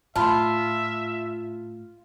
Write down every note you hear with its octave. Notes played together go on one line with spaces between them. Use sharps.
A2 F4 E5 A5 B5 C6